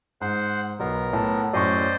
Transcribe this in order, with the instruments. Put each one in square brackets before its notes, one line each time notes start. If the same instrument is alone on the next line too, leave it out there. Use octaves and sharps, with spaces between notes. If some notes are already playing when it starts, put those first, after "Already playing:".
[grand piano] G#2 [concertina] C5 F#5
[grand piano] B1 [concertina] B3 A#4
[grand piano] A2 A5
[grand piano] F#2 A2 C#6 [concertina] C5 D5 D#5